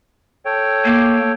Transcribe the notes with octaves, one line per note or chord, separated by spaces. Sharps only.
A4 C#5 G5
A#3